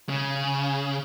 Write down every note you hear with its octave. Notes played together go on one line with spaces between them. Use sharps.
C#3